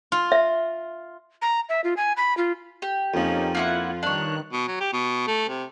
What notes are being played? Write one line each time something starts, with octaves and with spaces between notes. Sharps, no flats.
F4
E5
A#5
E5
F4
G#5
B5
F4
G4
F2 F3 A#3 C#4 D#4
A#3 E4 F4 F#5
G2 D#3 D4 C#5 F#6
B2
F#3
G4
B2
A3
C3